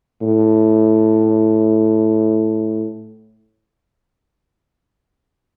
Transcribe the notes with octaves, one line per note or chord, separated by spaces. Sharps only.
A2